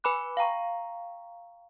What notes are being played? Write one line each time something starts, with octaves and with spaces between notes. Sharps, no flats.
B4 G#5 B5 D6 F#6
F5 G5 A#5 C#6